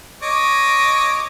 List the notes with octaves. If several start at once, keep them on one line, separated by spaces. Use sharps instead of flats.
C#5 D#5 D6